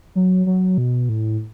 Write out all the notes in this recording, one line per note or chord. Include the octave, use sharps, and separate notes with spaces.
F#3
F#3
B2
A2